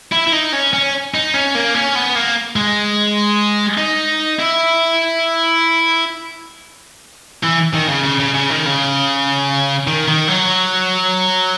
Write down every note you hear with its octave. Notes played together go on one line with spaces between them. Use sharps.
E4
E4
D#4
C#4
C#4
D#4
C#4
A#3
C#4
B3
A#3
G#3
D#4
E4
E3
D#3
C#3
C#3
C#3
C#3
D#3
C#3
D#3
D#3
F#3